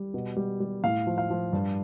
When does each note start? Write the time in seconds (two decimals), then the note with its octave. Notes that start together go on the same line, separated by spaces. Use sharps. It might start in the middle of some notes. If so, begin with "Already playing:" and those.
Already playing: G3
0.14 B2
0.37 G3
0.60 G3
0.84 A2 F5
1.07 F3
1.18 F5
1.30 F3
1.53 G2